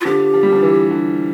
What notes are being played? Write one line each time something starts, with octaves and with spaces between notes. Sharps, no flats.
F4
D3 F3 G4
F3
G3
D3 F3
E3
D3